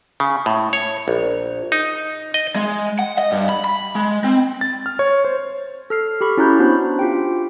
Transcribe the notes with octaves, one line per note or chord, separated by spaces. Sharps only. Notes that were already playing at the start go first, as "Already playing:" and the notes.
C#3
A2
C#5
A#1
D#4
D#5
G#3
F#5
D#5
G2
B5
B5
G#3
C4
A6
F6
C#5
C5
A4 F6 C7
G4 A4 B5 C#6 F6
C#4 E4 F#4 A#5 F#6 G6
B3 D4 F#4 C5
F4 G4 G5